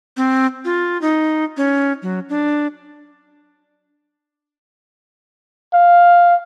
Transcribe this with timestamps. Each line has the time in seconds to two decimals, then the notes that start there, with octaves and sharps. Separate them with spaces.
0.17 C4
0.65 F4
1.02 D#4
1.57 C#4
2.02 F#3
2.29 D4
5.74 F5